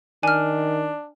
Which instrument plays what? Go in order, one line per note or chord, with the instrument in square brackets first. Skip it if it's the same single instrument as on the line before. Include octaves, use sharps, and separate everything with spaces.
[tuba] D#3 [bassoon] D4 [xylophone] G#5 F6